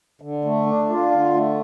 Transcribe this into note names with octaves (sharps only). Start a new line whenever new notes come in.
D3
A3
D4
F4
D3
A3